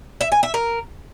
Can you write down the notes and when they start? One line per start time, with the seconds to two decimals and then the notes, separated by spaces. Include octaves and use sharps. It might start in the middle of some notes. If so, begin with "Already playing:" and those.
0.21 E5
0.32 G#5
0.43 E5
0.54 A#4